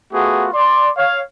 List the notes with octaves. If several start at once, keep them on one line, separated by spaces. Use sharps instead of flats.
A3 B3 F4 F#4 G#4
D5 C6
C#5 F5